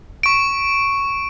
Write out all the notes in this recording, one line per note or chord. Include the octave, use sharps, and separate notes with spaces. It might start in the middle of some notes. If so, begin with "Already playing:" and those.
C#6 D7